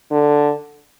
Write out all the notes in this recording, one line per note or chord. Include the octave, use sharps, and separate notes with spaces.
D3